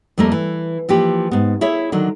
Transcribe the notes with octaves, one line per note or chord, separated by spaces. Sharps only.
F2 G3 A3 A#3 A#4
E3
E3 F3 A#3 G4
G#2 B3
E4 G#4 C#5 E5
D3 D#3 F#3